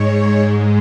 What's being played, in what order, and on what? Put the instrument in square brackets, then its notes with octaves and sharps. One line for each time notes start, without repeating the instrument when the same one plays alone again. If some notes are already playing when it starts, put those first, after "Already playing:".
Already playing: [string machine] G#2 G#3 C#5